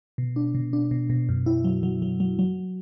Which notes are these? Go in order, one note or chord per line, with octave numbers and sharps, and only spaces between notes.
B2
D4
B2
D4
B2
B2
F#2
E4
F#3
F#3
F#3
F#3
F#3